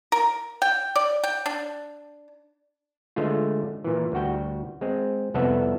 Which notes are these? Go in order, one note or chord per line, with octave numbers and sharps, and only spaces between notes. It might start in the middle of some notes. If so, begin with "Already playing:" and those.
A#4
G5
D5
G5
D4
D3 G#3 A3 F4
A#2 E3
D2 G3 F#4 G5
G#3 C4
C2 F2 B3 A4 E5 F#5